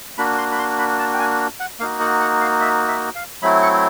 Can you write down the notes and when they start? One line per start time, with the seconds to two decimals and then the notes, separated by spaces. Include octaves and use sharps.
0.18 A#3 D4 F#4 B5
0.38 C6
0.51 B5
0.58 C6
0.79 B5
0.99 A5
1.14 G5
1.19 G#5
1.60 F#5
1.80 A#3 D#4 F#4 F5
2.00 F#5
2.21 F#5
2.41 F5
2.61 E5
2.88 E5
3.15 F5
3.42 F#3 A3 C4 E4 B5
3.63 C#6